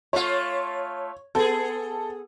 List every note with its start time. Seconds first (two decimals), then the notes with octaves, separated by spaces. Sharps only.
0.13 A3 F4 C#5
1.35 B3 G#4 A4